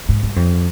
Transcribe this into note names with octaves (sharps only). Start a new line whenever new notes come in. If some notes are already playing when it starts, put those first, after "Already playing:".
G#2
G2
F2